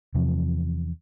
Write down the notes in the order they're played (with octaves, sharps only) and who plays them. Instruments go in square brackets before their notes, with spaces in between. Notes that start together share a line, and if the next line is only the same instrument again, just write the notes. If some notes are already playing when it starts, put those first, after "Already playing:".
[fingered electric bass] E2 C3 F3